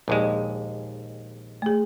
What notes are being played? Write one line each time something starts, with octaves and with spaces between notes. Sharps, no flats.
A#1 D#2 G#3
A3 G#4